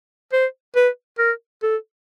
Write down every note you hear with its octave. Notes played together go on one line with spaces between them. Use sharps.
C5
B4
A#4
A4